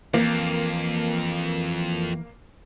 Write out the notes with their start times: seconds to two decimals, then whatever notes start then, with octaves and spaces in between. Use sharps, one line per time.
0.14 F2 E3 A#3